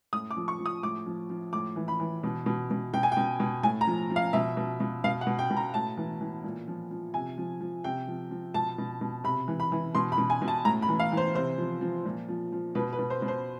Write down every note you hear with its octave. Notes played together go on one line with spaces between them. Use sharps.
A2 D#6
D6
F3
C#6
F3
D#6
A2 D6
F3
F3
A2 D6
E3
B5
E3
B2
B2
B2
B2 G5
G#5
B2 G5
B2
A2 G#5
A#5
F3
F3
F5
B2 E5
B2
B2
B2 F5
F#5
B2
G5
B2
A#5
A2 A5
E3
E3
A#2
F3
F3
C3 G#5
F3
F3
C3 G5
F3
F3
B2 A5
B2
B2
C3 B5
E3
B5
E3
B2 C6
B5
B2
G#5
B2
A5
A2 A#5
B5
E3
F5
E3
C5
C3 C5
F3
F3
A#2
F3
F3
B2 B4
B4
B2
C5
B2
C5